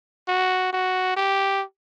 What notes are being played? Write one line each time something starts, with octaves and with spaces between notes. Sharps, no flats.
F#4
F#4
G4